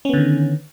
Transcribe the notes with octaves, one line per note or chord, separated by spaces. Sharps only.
D3 D#3 B3 C#4